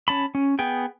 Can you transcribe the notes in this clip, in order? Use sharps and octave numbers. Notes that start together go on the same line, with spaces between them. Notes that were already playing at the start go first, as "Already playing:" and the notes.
C#4 A5 B5
C#4
B3 G#4 G5